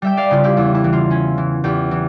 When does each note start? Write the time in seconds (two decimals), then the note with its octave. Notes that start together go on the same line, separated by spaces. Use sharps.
0.02 G3 E5 G5
0.17 D5 F5
0.31 C#3 F4
0.44 E4 G4
0.57 E2 E4
0.75 E4
0.84 E3
0.93 F4
1.10 C#4
1.38 E3
1.64 E2 E4 G4
1.91 E3